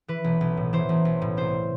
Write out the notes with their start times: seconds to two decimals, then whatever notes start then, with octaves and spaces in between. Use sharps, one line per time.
0.08 E3 B4
0.24 B1
0.41 B1
0.57 A2
0.73 E3 C5
0.89 B1
1.05 B1
1.22 A2
1.37 C2 C5